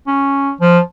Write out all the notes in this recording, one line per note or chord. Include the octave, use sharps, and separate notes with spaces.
C#4
F3